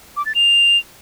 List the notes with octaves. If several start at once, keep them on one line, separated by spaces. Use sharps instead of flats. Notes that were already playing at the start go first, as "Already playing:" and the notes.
D6
A6
F7